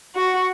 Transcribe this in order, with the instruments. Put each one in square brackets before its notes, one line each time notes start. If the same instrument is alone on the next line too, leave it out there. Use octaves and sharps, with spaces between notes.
[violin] F#4